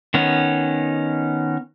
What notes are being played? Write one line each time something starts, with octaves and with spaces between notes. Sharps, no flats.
D#3 B3 C#4